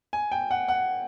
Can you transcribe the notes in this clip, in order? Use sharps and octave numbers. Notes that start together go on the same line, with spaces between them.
G#5
G5
F#5
F#5